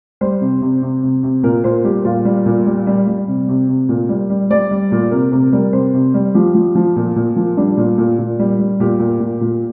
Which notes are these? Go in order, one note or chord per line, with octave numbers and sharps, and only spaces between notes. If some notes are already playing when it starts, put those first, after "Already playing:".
G3 C5
C3
C3
C3
C3
C3
A#2 A#4
A#2 C5
G3 G4
A#2 F4
G3
A#2
G3
G3
G3
C3
C3
C3
A#2
G3
G3
G3 D5
G3
A#2
C3 A#4
C3 A#4
G3 A#4
C3 C5
C3
G3
F3 G4
F3
F3
A#2
A#2
F3
G3 D4
A#2
A#2
A#2
G3
G3
A#2 G4
A#2
A#2
A#2